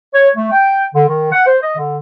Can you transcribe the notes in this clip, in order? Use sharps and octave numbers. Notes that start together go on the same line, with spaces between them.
C#5
A3
G5
D3
D#3
F#5
C5
D#5
D3